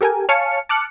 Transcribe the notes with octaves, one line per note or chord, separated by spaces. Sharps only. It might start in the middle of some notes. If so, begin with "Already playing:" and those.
G4 A4 A#4 G5 G#5
C#5 F5 G#5 A5 F6 C#7
A5 D6 F6 F#6 C#7